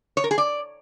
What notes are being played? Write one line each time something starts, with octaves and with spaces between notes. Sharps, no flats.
C#5
A#4
G#4
D5